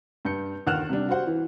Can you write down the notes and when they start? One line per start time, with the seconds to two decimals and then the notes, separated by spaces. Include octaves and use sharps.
0.25 G2 G6 C#7
0.66 G1 D#2 F#5 F6 F#6 E7
0.89 C3 G3 D4
1.09 F#4 G4 C5 F#5
1.27 E3